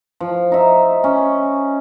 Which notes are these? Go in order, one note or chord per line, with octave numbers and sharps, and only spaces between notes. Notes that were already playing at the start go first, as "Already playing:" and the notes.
F3
D#4 E5
C#4